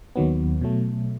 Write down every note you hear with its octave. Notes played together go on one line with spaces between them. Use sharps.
D#2 D#3 F#3 B3
B2 F#3 A3